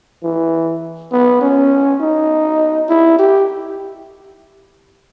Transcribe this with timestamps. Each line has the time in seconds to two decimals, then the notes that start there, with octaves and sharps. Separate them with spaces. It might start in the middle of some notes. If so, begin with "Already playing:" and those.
0.23 E3
1.12 B3
1.42 C#4
2.01 D#4
2.89 E4
3.19 G4